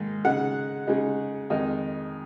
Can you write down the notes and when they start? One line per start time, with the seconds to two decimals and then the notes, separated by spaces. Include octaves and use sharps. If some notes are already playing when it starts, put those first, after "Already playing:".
Already playing: G#2 D#3 A#3
0.25 C#3 G#3 D#4 F#5
0.87 C#3 G#3 D#4
1.50 F2 D#3 G#3 D#4